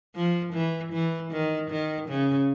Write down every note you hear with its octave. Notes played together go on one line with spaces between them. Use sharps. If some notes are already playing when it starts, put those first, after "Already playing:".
F3
E3
E3
D#3
D#3
C#3